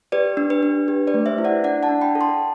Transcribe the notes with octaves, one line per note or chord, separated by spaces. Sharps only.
G4 B4 D5
D4
B4
D4
G4
B4 D5
A3
C5 E5
E4
D5 F#5
D4 D5 F#5
F#5 A5
D4
G5 B5
A4
A5 C6